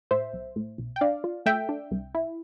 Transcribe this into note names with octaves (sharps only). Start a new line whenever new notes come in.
A2 C5 E5
B1
A2
B1
G5
D4 D5 F5
F4
A3 E5 G5
D4
C2
E4